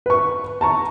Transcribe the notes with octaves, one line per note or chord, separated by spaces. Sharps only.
B4 C#6
A5 A#5 C#6